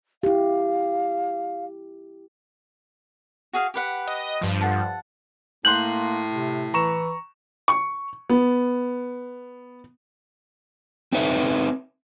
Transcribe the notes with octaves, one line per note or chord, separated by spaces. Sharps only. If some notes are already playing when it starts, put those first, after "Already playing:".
E4 G4 F5
F#4 G#4 F5
G4 B4 F#5
D#5
G2 F3
A4 F#5 A5
A2 A#3 C6 F#6 G6 F#7
C3
E3 A#5 C#6 E7
C#6
B3
C4 D#4 B4 C#5 E5